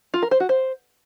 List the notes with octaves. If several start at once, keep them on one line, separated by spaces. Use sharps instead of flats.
F4
A#4
C5
F#4
C5